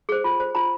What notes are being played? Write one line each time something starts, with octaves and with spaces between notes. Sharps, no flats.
G#4 C5
F4
C5
F4 A#5